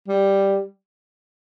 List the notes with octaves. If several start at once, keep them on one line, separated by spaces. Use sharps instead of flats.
G3